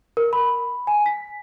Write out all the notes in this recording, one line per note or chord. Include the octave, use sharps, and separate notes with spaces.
A#4
B5
G#5
B6